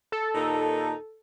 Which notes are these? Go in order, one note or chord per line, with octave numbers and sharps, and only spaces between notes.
A4
D#2 A#2 D#4